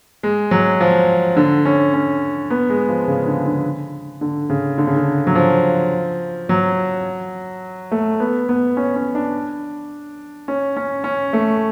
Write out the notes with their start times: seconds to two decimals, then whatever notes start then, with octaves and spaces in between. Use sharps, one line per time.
0.23 G#3
0.51 F#3
0.81 F3
1.37 D3
1.65 C#4
1.94 C#4
2.50 B3
2.70 G#3
2.89 F3
3.07 C#3
3.26 D3
3.46 D3
4.21 D3
4.50 C#3
4.78 D3
4.87 C#3
4.96 D3
5.27 F#3
5.35 F3
6.49 F#3
7.92 A3
8.20 B3
8.49 B3
8.77 C#4
8.96 C#4
9.15 D4
10.48 C#4
10.77 C#4
11.04 C#4
11.33 A3